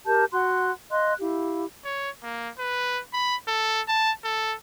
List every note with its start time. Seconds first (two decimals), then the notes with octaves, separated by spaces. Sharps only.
0.06 G4 A#4 A5 G6
0.32 F#4 F#5 C6 F#6
0.90 D#5 F5 C6 F#6
1.20 E4 G4 F5
1.85 C#5
2.23 A#3
2.59 B4
3.13 B5
3.47 A4
3.88 A5
4.24 A4